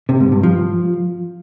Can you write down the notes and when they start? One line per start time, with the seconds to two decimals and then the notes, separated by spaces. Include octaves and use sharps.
0.09 C3
0.20 G#2
0.32 G2
0.43 F3